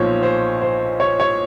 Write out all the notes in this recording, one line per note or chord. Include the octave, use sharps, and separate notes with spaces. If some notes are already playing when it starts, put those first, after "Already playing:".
Already playing: B1 A#2 F3 C5 C#5
C5
C5
C#5
C#5